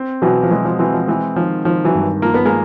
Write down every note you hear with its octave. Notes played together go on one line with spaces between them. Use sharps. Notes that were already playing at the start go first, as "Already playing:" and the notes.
Already playing: C4
B2 E3 F#3
F3
E3 F#3 G#3
F3
E3 F#3 C4
F3
E3 G#3
D#3 F3
D#3 F3
E3 F#3
G2
F3 A#3
B3
G#3 A#3